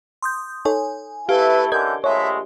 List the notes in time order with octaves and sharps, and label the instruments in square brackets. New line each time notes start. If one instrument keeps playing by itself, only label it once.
[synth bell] C6 D#6 G6
[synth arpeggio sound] D#4 A4 C#5 [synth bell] G#5
[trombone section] A3 E4 [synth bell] G4 [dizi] B4 [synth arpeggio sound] F5
[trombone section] D3 E3 C#4 [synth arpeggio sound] A#4 D#5 G#6 [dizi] G6
[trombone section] A#1 G#3 A3 [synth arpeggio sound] C#5 [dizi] E5